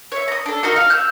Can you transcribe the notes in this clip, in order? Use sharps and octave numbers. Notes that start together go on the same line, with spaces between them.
C#5 E5
A#5 D#6
D4 A4
D#4 F#4 A#4 D#5
F5
E6 G6